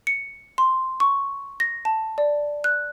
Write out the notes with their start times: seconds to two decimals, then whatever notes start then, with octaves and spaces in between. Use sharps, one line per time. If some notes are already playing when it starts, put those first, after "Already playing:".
0.07 C#7
0.58 C6
1.00 C#6
1.60 A#6
1.85 A5
2.18 D5
2.64 F#6